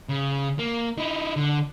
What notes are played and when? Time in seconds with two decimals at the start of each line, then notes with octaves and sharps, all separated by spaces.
0.09 C#3
0.59 A#3
0.98 D#4 E4
1.36 D3